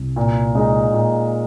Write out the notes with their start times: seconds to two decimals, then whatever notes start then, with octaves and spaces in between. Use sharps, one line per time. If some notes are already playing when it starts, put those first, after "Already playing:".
Already playing: C2 C3
0.16 A#2
0.55 G#3 D#4
0.94 A#2